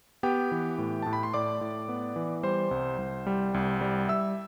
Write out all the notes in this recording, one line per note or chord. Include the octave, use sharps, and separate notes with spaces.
B3 G4 G5
E3
A2
A2 A5
B5
C6
A2 D5 D6
A2
B3
E3
G3 C5 C6
C2
C2
G3
C2
G3
G3 E5 E6